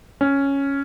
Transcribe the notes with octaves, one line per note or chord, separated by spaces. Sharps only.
C#4